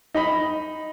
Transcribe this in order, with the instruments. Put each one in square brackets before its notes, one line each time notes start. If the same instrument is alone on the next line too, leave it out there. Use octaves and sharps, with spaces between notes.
[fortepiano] D#4 D#5 B5